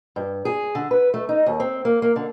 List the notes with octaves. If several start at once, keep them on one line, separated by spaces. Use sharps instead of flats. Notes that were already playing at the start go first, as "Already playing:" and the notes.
G2
G#4
D3
B4
A3
D#4
D#2
C4
A#3
A#3
D3